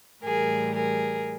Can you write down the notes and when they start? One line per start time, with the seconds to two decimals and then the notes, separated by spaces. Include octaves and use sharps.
0.23 A2 E3 G3 G#4 A#4
0.73 G#4 A#4